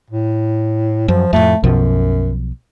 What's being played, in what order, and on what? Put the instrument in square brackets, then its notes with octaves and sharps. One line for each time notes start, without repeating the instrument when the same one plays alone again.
[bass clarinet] A2
[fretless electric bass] F#2 [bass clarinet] F3
[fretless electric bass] F2 A2 [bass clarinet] A3
[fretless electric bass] B1 B2 F3 [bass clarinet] F#2